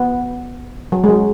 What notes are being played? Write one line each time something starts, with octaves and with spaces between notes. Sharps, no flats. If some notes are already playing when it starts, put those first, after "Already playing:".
Already playing: B3
F#3
G#3
F#3